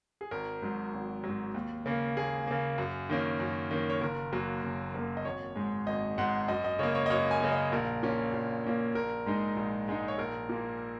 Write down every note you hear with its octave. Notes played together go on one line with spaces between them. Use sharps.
G#4
G#1 A#4
G#2 F#3
G#1
G#2 F#3
D#2
C#3 A#3
D#2 G#4
C#3 A#3
F#2
D#3 A#3 C#4
F#2
D#3 A#3 C#4
C#5
F#1 A#4
F#2 F#3 A#3
F#1
F#2 F#3 A#3
D#5
G#1 C#5
G#2 G#3
G#1 D#5
G#2 G#3 F#5
F#2 D#5
D#5
C#3 A#3 C#5
C#5
D#5
F#2 C#5
G#5
C#3 A#3
D#5
A#1 A#4
A#2 A#3 C#4
A#1
A#2 A#3 C#4
A#1 A#4
G#2 G#3 D#4
A#1
G#2 G#3 D#4
C#5
A#1 A#4
A#2 A#3